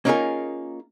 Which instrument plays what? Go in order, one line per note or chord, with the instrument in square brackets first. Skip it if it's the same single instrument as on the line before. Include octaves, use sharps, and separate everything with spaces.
[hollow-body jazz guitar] A#3 C#4 D#4 F4 G#4 A#4